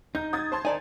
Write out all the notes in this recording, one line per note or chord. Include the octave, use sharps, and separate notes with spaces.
D#4 G6
D#6 G#6 A6
C5 A5 C6
D#3 D#4 D5 G#5